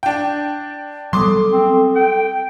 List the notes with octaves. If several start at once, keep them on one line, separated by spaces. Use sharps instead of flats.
D4 G5
F#3 G3 B3 A4 C6 D6 D#6
C4
G5